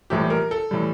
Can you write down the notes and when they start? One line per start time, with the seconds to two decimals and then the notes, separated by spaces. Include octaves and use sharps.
0.10 A#1 A2 E3 G3 G4
0.30 A#4
0.51 A4
0.71 A2 E3 G3